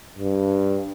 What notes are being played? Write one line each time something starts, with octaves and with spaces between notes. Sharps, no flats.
G2